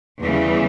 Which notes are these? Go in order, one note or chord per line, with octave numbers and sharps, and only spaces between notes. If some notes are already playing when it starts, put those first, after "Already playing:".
E2 C#3 E3 G3